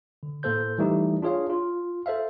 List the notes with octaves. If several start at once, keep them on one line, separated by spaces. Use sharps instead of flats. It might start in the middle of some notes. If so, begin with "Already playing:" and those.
D3
A2 A#3 A4 C5 G6
E3 G3 A3 D#4 G4
D4 F4 G#4 C#5 F5
F4
A4 C5 E5 F5